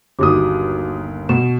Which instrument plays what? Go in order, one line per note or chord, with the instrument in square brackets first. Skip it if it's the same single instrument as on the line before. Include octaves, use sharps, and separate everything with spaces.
[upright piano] G1 D#2 D#6 [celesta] F#4 G4 D6
[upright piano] B2 [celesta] E7